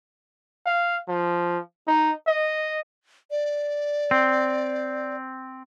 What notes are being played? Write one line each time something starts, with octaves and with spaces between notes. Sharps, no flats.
F5
F3
D#4
D#5
D5
C4